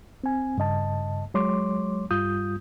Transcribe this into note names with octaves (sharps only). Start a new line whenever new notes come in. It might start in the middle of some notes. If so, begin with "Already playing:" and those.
C4 G#5
G2 C#3 D#5 A5
F#3 G#3 C#5 C6 D6
G2 G3 F4 D#6 G6